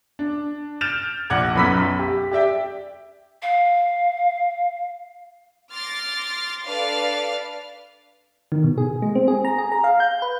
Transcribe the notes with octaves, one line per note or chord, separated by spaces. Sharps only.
D4
F6 G6 A6 D7 E7 F7
A#1 F#5 D6 G#6
B1 F#2 B4 B5 E6 B6
G4
G4 D5 E5 G5
F5
C6 D6 F6 A6 A#6
D4 A4 B4 D5 F5 A6
D#3
B2
G#4
G#3
C4
G#4
A#5
G#4
A#5
F5
G6
B4